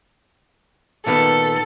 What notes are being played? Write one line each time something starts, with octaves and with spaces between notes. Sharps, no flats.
A#2 D#3 B3 A4